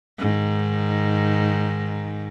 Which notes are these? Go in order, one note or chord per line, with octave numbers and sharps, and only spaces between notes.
G#2 D#3